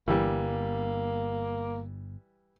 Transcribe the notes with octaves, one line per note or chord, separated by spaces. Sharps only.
G1 E3 G3 A#3